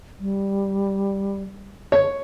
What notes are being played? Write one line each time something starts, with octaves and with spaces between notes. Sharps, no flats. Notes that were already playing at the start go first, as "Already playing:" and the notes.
G3
C#5